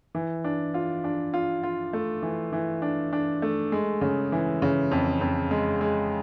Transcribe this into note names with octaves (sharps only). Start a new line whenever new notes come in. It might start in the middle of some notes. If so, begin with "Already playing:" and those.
E3
D4
F4
D4
F4
F4
A3
E3
E3
D4
D4
A3
G#3
C#3
E3
C#3
F2
F2
G#3
G#3